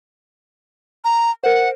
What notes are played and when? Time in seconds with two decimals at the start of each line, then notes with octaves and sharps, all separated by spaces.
1.04 A#5
1.43 A#4 C5 F#5